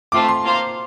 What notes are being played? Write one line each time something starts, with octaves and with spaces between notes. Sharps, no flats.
A3 C4 F4 D6
C6
A#3 F4 C5 F5